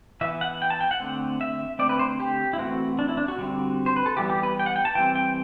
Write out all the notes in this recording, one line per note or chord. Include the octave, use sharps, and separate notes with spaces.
E3 B3 E5
F#5
G5
A5
G5
F#5
D3 A3 C4
E5
D3 A3 C4 D5
B4
C5
G4
E4
E3 A3 C4 F#4
D4
E4
D4
F#4
D3 G3 C4
C5
B4
A4
E3 G3 B3 G4
G4
B4
G5
F#5
G5
A5
E3 G3 C4 G5
G5